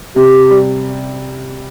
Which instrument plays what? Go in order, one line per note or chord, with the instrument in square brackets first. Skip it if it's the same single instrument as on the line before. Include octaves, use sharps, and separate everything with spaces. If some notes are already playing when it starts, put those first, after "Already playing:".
[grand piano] C3 [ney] G4
[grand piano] G3